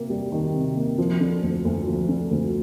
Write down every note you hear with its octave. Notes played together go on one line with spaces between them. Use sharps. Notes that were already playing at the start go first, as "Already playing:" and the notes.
Already playing: C3 A#3
G3
D#3
C3
A#3
F3
D3
D2
D2
F3
D3
D2